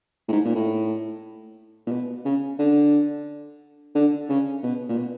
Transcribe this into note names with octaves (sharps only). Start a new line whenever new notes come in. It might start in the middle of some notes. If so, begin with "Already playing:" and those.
A2
G#2
A#2
A2
A#2
B2
C#3
D3
D3
C#3
B2
A#2
B2